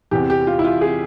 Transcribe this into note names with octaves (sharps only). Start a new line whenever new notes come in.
E2 C3 E3 G4
G4
F4
E4
F4
G#4